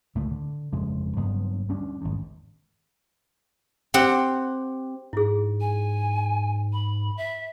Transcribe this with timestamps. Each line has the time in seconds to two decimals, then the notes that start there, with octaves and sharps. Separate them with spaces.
0.15 C#2 A2 D3 A3
0.31 D3
0.73 G1 F2 C#3 G#3
1.17 F#1 G2 B3
1.69 D2 G3 C#4 D4
2.01 G#1 E2
3.94 C4 G4 F#5
5.13 G#2 E4 G#4
5.61 G#5
6.73 B5
7.17 E5